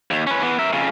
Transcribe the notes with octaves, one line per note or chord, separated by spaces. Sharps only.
D#2
C#4 B4
E3 B3
A#4 E5
F2 C#3